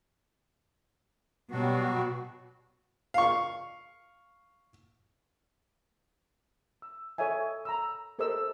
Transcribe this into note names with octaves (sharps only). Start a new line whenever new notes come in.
B2 F#3 G3 F#4
F5 C#6
E6
A4 C#5 D#5 E5 G#5
A#5 B5 E6
G4 A4 A#4 C5 D#5 E6